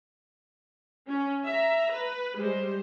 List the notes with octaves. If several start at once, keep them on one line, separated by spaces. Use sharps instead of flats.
C#4
E5 A#5
B4
G3 G#3 C5